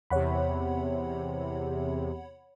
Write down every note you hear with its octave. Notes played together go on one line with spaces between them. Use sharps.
E2 C3 C#5 F#5 B5